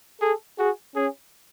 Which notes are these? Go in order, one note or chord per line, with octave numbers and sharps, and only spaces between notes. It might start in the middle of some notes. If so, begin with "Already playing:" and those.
G#4 A4
F#4 G#4
C#4 G#4